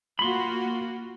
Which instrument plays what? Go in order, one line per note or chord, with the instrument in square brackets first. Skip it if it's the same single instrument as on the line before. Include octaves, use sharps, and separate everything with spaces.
[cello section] A#3 F4 F#4 [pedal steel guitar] B5 C6